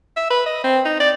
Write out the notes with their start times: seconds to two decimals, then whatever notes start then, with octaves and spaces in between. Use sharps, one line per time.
0.16 E5
0.30 B4
0.46 D#5
0.64 C4
0.85 D#4
1.00 D5